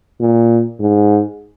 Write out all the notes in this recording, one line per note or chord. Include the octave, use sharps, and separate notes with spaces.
A#2
G#2